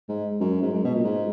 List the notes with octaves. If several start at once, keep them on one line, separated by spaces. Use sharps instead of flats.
G#2
F#2
G#2
F#2
B2
A#2
G#2